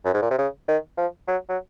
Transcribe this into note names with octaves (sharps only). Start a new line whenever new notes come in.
F#2
G#2
A#2
C3
C#3
D#3
F3
F#3
F#3